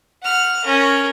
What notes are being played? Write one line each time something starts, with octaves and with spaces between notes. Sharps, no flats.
F#5 F6
C#4 A#4